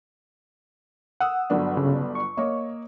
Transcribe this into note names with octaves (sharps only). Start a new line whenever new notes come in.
F#5 D#6 E6
G1 F#3 D4
C#3
C#6
A#3 C#5 D#5